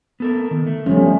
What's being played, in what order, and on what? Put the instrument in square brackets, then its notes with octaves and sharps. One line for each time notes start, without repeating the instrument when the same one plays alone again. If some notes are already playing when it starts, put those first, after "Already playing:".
[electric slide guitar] B3 A4 A#4
D#3
A3
[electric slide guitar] F3 B3 [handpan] G3 A3 C#4